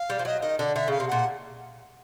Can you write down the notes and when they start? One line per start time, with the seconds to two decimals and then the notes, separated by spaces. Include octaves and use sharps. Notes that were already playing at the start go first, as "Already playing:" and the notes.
Already playing: F5
0.10 G3
0.19 F3
0.25 F#3 D#5
0.41 D#3 D#5
0.58 D3 D5
0.76 D3 E5
0.88 C#3 F5
1.00 C3
1.08 A#2 F#5